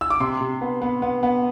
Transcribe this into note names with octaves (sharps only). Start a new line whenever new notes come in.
E6
D6
C3 C6
C3
B3
B3
B3
B3